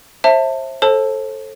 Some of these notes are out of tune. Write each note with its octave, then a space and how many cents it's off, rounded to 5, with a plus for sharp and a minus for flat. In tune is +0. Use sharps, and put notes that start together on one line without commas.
C5 +35 E5 +0 A5 +25
A4 +0 C5 +35 A5 +0